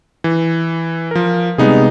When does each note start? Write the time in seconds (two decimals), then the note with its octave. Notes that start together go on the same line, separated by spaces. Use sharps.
0.24 E3
1.11 F3 A#4
1.58 C3 G3 G#3 B3 D#4 G#4